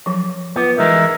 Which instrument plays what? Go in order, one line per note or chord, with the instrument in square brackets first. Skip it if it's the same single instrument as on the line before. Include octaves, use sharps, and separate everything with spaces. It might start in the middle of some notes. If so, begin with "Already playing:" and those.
[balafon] F3 F#3
[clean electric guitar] B3 [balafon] F4 B4 D6
[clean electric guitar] E3 G#3 D#4 [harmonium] A#4 E5